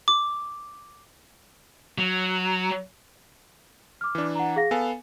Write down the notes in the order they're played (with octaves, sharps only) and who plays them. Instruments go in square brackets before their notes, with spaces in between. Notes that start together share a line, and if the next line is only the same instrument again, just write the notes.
[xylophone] D6
[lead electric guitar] F#3
[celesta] D6 F6
[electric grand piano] E3 D4
[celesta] F#5 A#5
G#4 F5 A#6
[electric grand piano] B3 A4 F5 [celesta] G#5